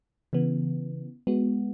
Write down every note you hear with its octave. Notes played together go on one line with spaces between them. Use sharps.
C#3 E3 B3
G#3 B3 F#4